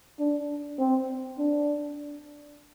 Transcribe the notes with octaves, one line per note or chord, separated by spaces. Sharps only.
D4
C4
D4